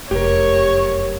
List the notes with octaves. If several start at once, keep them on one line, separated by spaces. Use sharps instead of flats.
F1 F#2 G4 A#4 C#5